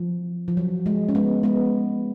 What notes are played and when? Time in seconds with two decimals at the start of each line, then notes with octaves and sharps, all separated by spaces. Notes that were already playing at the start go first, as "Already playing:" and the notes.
Already playing: F3
0.48 F3
0.57 F#3
0.86 G#3
1.09 C#4
1.15 G#3 B3
1.43 G#3 B3